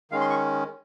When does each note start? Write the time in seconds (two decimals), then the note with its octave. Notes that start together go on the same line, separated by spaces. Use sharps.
0.11 D#3 G#3 C#4 F5
0.21 C6
0.30 C#6